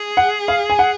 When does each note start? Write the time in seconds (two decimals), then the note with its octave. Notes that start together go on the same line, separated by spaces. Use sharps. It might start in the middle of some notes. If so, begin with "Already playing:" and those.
Already playing: G#4
0.17 F#5
0.48 F5
0.70 G#5
0.79 F#5